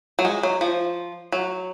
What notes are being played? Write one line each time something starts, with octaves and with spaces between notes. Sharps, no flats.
F#3
G#3
F#3
F3
F#3